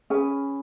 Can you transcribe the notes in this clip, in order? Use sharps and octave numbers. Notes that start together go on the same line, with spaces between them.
C#4 G#4 B4 G#5